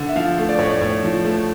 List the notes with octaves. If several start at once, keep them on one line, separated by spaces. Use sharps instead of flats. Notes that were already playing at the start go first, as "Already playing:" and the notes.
Already playing: D3
E5
F3 F5
A3
D5
A2 C#5
D5
A2 C#5
F3
A3